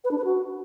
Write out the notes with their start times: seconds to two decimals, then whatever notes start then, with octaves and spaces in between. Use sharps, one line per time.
0.04 B4
0.11 D4
0.18 B4
0.24 F#4